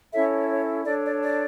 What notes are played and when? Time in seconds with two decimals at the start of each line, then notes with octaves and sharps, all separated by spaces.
0.13 C#4 E4 A4 C#5 E5
0.50 C#5
0.86 D4 A4 C#5 D5
1.05 D5
1.23 D5